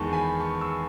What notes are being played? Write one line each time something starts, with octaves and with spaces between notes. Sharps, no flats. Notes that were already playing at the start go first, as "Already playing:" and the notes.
Already playing: E2 D#3 G#3 B3 A5 C#6
G#5 B5
A5 C#6
C#6 E6